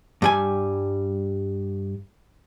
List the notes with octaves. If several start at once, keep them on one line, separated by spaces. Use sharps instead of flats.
G2 G3 G#5